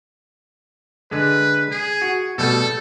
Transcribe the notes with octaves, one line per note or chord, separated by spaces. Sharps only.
D3 G#3 B4
G#4
F#4
B2 G3 A3 A4